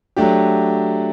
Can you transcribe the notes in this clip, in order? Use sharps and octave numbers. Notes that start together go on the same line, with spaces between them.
F#3 A3 D4 G4